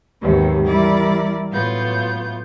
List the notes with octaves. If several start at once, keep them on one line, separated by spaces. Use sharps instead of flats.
D#2 G#2 C3 D#3 F#3 B3
E3 G3 E4 A#4 D5
A2 F#3 B3 F4 G6